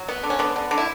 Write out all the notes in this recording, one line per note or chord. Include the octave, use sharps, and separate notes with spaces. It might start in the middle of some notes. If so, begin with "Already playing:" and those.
Already playing: F#3
B3
D3
C#4
D3 B3
D3
D3
E4